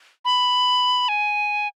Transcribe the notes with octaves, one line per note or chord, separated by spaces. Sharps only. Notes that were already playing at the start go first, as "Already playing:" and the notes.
B5
G#5